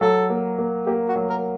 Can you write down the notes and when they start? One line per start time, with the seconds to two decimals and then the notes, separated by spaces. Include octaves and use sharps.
0.01 F#3 A4
0.30 A#3
0.58 A#3
0.86 A#3 G4
1.08 F#4
1.16 F#3
1.29 A#4